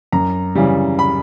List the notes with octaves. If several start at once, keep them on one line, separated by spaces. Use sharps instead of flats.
F#2 A#5
C#3 E3 G3
B5